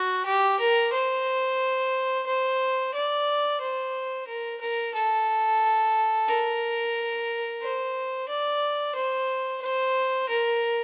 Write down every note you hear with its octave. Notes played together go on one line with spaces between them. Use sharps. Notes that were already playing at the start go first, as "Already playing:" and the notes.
Already playing: F#4
G4
A#4
C5
C5
D5
C5
A#4
A#4
A4
A#4
C5
D5
C5
C5
A#4